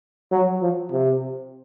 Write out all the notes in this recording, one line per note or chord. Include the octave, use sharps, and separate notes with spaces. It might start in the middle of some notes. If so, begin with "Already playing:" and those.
F#3
F3
C3